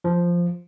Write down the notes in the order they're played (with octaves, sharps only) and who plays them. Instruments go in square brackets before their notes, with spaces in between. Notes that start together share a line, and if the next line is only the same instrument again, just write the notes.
[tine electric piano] F3